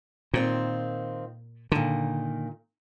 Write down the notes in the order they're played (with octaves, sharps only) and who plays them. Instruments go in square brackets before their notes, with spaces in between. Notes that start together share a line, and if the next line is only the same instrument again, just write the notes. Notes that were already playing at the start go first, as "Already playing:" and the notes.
[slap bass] A#2 [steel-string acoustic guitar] D#3 C4 F4
[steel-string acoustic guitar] A#2 D#3 [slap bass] D3